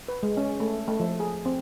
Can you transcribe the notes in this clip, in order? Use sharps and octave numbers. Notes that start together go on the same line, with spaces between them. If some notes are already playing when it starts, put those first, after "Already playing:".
B4
G#3
C#4
A3
A3
F3
G#4
C4